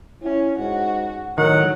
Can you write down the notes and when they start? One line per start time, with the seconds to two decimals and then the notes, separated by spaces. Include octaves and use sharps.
0.23 C#4 E4
0.59 G#2 F#4
1.38 A2 D#3 F#3 F#5